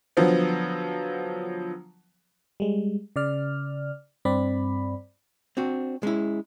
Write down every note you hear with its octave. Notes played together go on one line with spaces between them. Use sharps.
D3 F3 F#3 B3
G3 G#3
C#3 D5 F6
G2 C4 D5 B5
C4 D4 F#4
G#3 C#4 E4